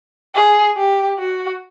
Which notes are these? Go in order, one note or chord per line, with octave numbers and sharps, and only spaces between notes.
G#4
G4
F#4